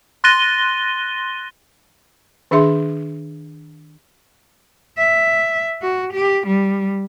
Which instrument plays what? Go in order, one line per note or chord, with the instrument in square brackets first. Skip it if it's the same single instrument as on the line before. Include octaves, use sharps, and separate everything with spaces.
[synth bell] C6 F#6 A6 A#6 D#7 G7
[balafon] D#3 D4 G#4 E5 C6
[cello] E5
F#4
G4
G3